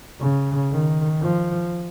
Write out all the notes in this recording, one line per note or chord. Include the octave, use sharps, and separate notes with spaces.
C#3
D#3
F3